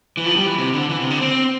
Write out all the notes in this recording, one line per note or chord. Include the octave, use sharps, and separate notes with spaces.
E3
F3
G3
E3
C3
D3
E3
C3
D3
C4